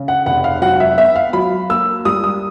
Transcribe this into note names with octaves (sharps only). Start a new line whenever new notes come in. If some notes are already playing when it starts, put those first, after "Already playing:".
Already playing: C#3
F#5
F1 F#5
F5
F#3 F#5
E5
B3 E5
F5
F#3 B5
A#3 E6
G3 D#6
D#6